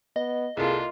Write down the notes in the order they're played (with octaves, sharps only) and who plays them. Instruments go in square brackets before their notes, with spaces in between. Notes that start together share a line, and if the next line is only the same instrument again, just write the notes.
[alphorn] B3 [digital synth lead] D#5
[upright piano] C2 A4 [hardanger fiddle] A#3 F4 [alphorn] G#4